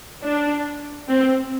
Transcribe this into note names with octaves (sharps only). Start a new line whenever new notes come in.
D4
C4